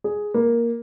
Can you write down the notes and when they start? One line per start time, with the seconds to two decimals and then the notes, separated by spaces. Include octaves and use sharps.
0.04 G#4
0.34 A#3